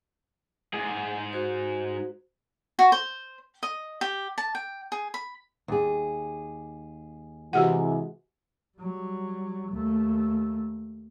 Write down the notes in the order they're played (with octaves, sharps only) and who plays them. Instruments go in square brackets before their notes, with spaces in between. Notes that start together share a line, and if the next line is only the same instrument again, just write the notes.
[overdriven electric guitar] G#2 G#4
[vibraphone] F#4 C5
[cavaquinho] F#4
C5
D#5
G4
A5
G5
G#4
B5
[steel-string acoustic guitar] D#2 G#4
[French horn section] C3 E3 G#3 [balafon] F#4 G4 F#5
[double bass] F#3 G3
D#2 A3